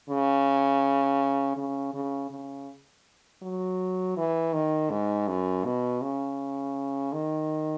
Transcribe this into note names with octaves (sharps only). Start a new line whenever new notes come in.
C#3
C#3
C#3
C#3
F#3
E3
D#3
G#2
F#2
B2
C#3
D#3